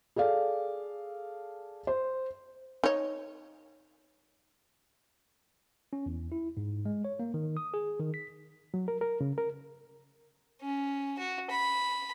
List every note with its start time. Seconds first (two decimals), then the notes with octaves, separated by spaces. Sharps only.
0.16 G#4 A4 D5 F5
1.87 C5
2.84 D#4 C#5
5.93 C#4
6.06 E2
6.32 E4
6.57 G#2
6.85 G#3
7.05 C#5
7.19 A#3
7.34 D#3
7.57 D#6
7.74 G#4
8.00 D#3
8.14 B6
8.74 F#3
8.88 A#4
9.01 A#4
9.21 C#3
9.38 A#4
10.62 C#4
11.18 F#4
11.50 B5